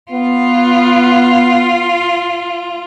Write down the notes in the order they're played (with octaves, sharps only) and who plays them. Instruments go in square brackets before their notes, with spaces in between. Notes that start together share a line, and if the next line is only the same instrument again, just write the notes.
[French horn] B3 [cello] F4